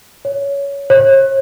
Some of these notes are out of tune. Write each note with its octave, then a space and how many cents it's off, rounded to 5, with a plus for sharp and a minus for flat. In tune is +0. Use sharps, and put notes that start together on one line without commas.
C#5 +15
C#5 -45